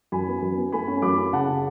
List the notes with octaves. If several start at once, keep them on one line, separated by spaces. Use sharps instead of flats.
F#2 G#5 B5
B3
F#2
B3
A3 G#5 B5
C#4
F#2 B5 D6
C#4
C#3 F#5 A5
C#3